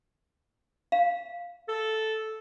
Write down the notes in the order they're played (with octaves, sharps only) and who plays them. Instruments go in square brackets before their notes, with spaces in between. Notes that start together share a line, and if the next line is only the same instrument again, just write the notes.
[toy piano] F5
[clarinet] A4